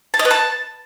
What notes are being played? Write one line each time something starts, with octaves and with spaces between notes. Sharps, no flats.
A5
D#5
B4
A5